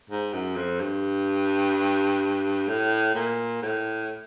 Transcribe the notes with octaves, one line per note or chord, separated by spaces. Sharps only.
G#2
F#2
F2
G2
A2
A#2
A2